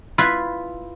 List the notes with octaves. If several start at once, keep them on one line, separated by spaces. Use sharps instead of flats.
E4 F4 B4